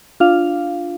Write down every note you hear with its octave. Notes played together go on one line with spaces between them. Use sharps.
D4 F4 F5